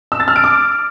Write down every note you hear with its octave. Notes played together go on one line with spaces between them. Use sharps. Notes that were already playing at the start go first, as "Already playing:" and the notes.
E6
A6
F6
D7
D6